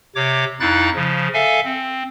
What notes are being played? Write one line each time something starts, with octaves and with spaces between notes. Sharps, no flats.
C3 C#5 D6
F2 D#4 E4 F5 F#6 A6
C#3 F3
A4 E5 F5 G#5
C4